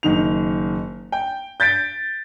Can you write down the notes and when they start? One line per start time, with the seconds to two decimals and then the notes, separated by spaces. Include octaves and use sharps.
0.03 F#1 D#3 F7
1.12 G5
1.60 G6 A6 B6 D7